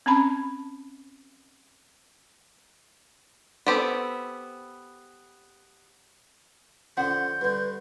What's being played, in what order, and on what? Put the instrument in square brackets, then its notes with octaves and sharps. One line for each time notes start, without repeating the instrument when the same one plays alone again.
[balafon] C4 C#4 A5 B5
[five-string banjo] B3 C4 G4 A4
[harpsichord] D3 F3 [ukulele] C#4 F#5 [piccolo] G6
[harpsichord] G2 D3 [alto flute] B4